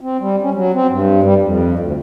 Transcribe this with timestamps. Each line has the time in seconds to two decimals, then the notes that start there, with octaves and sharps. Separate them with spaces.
0.01 C4
0.20 G3
0.42 C#4
0.54 F#3
0.74 C4
0.89 G2
1.24 G3
1.41 F2
1.79 D2